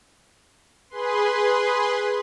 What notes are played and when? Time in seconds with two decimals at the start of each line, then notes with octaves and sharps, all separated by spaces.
0.90 G#4 B4 C6